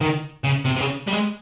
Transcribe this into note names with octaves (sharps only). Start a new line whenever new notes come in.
D#3
C#3
C3
C3
C#3
G3
G#3